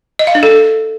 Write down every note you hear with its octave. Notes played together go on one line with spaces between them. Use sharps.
D#5
F5
D4
A4